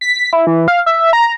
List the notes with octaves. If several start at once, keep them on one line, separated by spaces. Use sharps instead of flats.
B6
E4
E3
F5
E5
A#5